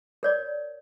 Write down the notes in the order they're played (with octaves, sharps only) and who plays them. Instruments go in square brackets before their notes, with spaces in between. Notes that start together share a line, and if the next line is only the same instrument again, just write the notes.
[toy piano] A#4 C#5 D5